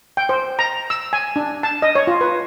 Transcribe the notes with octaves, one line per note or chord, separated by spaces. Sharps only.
G5
C5
A#5
E6
G#5
D4
A5
D#5
C#5
F4
B4